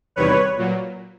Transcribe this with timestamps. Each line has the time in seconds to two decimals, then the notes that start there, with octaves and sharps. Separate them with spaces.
0.16 E2 C3 D#3 G3 B4 C#5
0.58 A#2 F#3